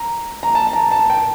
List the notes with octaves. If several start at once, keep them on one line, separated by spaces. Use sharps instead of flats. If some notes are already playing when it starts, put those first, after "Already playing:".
Already playing: A#5
A#5
A5
A5
A#5
A5
G5